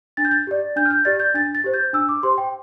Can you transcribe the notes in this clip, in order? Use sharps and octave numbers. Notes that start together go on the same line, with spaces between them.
D4 A6
G6
A6
G4 D5
D4 G6
F6
G6
G4 D5 A6
G6
D4 A6
A6
G4 C5
G6
D4 E6
D6
G4 C5 C6
G5